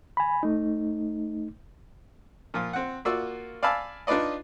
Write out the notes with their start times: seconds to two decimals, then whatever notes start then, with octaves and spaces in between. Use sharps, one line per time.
0.17 G#5 B5
0.43 A3 D#4
2.54 A#2 F3 F4
2.73 C4 F#5
3.05 A#3 F4 F#4 D5 E6
3.63 D5 F5 G#5 A5 B5 E6
4.07 D4 D#4 F4 B4 D5 D#5